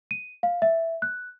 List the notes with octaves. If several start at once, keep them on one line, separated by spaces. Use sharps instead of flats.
D#7
F5
E5
F#6